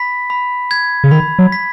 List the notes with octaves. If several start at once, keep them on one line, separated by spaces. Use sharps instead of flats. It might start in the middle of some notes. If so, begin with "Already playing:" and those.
Already playing: B5 B6
B5
G#6
C#3
D#3 B5
F#3
B6